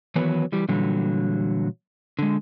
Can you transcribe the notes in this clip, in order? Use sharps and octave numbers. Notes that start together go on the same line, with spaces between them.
D#3 E3 F#3 B3 B4 C#5
E3 G3
A#2 D3 E3 F#3 G3
D3 G#3